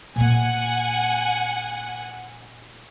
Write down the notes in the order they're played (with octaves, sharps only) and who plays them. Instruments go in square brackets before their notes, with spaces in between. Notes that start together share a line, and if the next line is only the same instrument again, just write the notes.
[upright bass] A#2 A#3 [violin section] F#5 G#5